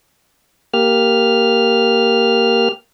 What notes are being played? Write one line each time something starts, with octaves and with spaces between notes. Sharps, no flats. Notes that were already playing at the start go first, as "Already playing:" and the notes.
A#3 G4 F6